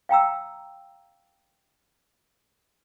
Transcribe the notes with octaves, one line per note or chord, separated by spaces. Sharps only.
F5 G5 A#5 E6